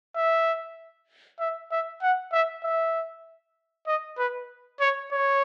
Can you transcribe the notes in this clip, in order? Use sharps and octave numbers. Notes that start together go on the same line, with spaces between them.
E5
E5
E5
F#5
E5
E5
D#5
B4
C#5
C#5